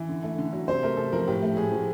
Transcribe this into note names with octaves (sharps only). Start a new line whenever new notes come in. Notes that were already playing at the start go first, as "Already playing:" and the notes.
Already playing: E3
D3
A3
D3
F#3
C3 C5
A3 A#4
C3 A4
F3 A#4
A2 G4
A3
A2 G#4
F3